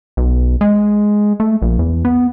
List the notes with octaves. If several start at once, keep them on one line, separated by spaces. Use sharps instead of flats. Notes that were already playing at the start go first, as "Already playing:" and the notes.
B1
G#3
A3
A#1
E2
B3